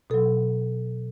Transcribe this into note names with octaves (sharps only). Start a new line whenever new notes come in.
B2 F#3 A4